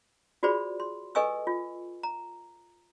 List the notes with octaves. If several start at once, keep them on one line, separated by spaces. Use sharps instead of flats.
F4 F#4 G#4 C5 D5 B5
C6
A4 B4 D#5 G#5 C#6 E6
F4
A#5